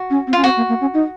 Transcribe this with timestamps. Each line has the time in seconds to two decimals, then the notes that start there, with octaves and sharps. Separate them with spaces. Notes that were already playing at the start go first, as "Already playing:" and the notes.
Already playing: F#4
0.10 C#4
0.27 C4
0.33 C#4 F4
0.44 C4 F#4
0.57 A#3
0.69 A#3
0.81 C#4
0.94 D#4